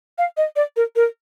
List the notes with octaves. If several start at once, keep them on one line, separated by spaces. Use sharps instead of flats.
F5
D#5
D5
A#4
A#4